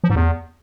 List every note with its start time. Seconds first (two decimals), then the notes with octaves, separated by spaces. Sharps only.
0.04 F3
0.10 G#2
0.16 E2